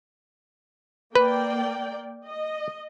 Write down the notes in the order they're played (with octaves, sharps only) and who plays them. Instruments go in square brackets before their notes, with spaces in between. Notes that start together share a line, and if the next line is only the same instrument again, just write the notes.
[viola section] A#3 D5 G5 [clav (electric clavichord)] B4
[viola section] D#5